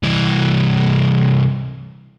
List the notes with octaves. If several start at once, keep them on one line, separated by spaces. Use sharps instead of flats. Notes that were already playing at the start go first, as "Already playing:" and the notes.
C2 E3